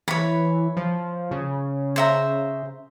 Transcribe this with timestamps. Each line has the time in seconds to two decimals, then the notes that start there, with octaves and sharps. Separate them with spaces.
0.08 E3 C#5 B5
0.77 F3
1.31 C#3
1.96 C5 E5 A#5